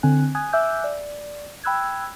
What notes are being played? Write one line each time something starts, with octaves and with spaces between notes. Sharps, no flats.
D3 C4 G#5 F#6
G#5 D#6 F#6 G#6
E5 G#5 D6 E6 F#6 G6
D5
G5 B5 E6 F#6 G#6